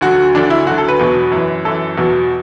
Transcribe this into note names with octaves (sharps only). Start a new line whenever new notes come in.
D2 D3 F#3 F#4
D2 D3 F#3 D4
E4
D2 D3 F#3 F#4
A4
B4
E2 B2 F#3
F#2 E3
F#2 E3 A4
E2 B2 F#3